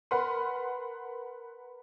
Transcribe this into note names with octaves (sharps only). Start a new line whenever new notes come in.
A#4 B4 F#5 B5 C6